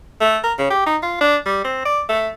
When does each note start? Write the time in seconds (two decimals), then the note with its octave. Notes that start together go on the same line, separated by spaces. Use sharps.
0.21 A3
0.44 A#4
0.59 C#3
0.70 G4
0.86 D#4
1.03 F4
1.21 D4
1.46 G3
1.64 C4
1.85 D5
2.09 A3